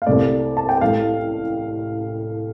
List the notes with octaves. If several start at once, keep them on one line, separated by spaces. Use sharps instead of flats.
F5
C2 C3 A3 D5
A5
G5
A1 A2 A3 F5